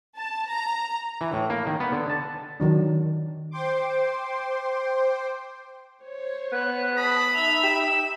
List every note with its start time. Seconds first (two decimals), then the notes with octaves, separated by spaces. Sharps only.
0.17 A5
0.50 A#5
1.21 E3
1.33 A2
1.50 A#3
1.67 D#3
1.80 B3
1.92 D3
2.10 A5
2.60 D#3 F#3 D4
3.51 C5 G5 C6 D6
6.02 C5 C#5
6.52 B3 F#6
6.97 G#4 A5 B5 D#6
7.34 D#4 E5 F7
7.63 G4 E7